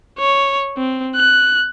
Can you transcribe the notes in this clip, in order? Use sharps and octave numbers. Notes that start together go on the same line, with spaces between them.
C#5
C4
F#6